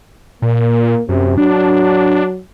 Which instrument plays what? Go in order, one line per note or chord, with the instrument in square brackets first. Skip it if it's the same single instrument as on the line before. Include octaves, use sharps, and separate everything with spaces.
[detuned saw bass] A#2 [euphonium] A#3
[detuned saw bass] F#2 [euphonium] C3
[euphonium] F#3 [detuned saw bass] D4